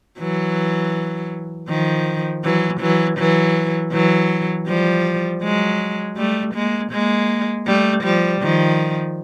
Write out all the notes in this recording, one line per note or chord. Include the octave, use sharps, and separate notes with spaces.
E3 F#3
D#3 F3
E3 F#3
E3 F#3
E3 F#3
E3 F#3
F3 G3
F#3 G#3
G3 A3
G#3 A#3
G#3 A#3
G3 A3
F3 G3
D#3 F3